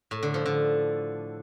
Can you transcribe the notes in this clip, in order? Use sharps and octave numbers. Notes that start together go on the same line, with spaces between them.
A2
D3
F3
D3